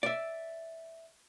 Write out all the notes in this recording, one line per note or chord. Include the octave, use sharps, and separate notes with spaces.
D5 E5